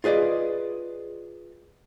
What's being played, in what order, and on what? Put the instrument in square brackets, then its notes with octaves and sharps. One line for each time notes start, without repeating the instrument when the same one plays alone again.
[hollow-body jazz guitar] F4 G#4 B4 D5 D#5